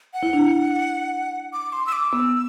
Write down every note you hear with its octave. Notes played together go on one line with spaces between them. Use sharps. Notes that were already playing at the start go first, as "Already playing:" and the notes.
F#5
E4
D4
D6
C6
E6
D6
B3 E6